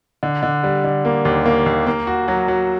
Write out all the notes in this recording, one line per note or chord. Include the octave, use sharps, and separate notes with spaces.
D3
D3
G3
D3
A#3
D#2
A#3
D#2
A#3
F#4
F#3
F#3